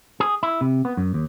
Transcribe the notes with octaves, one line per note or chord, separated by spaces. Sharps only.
G#4
E4
C3
B3
F#2
D#2